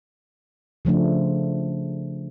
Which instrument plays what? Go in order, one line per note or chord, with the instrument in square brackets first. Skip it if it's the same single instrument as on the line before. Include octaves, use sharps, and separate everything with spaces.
[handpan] C#3 F3 A3 D4